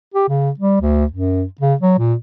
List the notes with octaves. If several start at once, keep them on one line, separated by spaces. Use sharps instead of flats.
G4
C#3
G3
D2
F#2
C#3
F#3
A#2